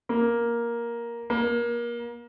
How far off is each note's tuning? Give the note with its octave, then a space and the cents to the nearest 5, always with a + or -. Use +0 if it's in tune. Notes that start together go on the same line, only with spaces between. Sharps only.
A#3 +10
A#3 +30